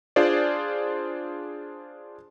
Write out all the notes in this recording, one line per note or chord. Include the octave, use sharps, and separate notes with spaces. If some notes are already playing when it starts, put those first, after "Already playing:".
D4 F4 G#4 C5 D5